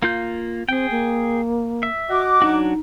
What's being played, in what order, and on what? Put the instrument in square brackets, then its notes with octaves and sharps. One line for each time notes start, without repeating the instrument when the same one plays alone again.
[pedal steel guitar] A#3 F4 G6
[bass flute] C4 [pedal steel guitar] G#4 G5
[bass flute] A#3
[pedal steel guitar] E5
[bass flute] F#4 [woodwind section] D#5 F#5 D6
[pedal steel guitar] F#3 D4 F#4 [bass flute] D#4